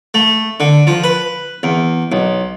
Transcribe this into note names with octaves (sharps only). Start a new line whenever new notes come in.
A3
D3
F3
B4
E2
B1